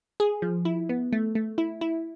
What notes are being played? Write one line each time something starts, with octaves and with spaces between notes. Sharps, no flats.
G#4
F3
E4
B3
A3
A3
E4
E4